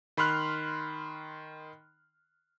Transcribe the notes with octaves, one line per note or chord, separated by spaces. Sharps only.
D#3 B5 C6 F6 F#6